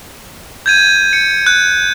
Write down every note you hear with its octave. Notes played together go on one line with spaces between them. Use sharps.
G6 G#6 D#7
C#7
F#6